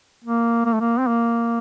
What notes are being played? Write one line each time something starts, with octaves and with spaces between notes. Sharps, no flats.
A#3
A#3
A3
A#3
C4
A#3